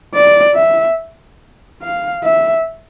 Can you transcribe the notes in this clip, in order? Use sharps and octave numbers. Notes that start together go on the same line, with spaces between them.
D5
E5
F5
E5